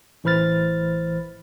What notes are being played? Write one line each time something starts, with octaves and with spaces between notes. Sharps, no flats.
A1 E3 C5 B5 F6 A6